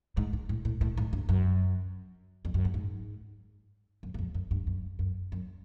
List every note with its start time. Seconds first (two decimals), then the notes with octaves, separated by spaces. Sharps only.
0.17 G#2
0.33 G#2
0.49 A2
0.65 A2
0.81 A2
0.97 G#2
1.13 G2
1.29 F#2
2.45 F2
2.54 F#2
2.65 G2
2.74 G#2
4.03 F#2
4.14 F#2
4.19 F2
4.34 F#2
4.51 G2
4.67 F#2
4.99 F#2
5.32 F#2